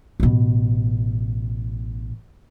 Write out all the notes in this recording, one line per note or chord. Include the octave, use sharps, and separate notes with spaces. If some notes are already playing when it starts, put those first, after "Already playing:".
A1 B2